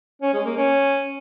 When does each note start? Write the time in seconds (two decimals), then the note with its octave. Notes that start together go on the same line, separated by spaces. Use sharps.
0.22 C#4
0.34 G#3
0.45 A#3
0.57 C#4